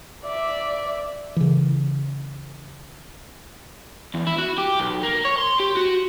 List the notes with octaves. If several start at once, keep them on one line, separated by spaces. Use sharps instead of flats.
D5 E5
C#3 E3
E2
E4
F#4
G4
B1
A#3
C#5
C6
G4
F#4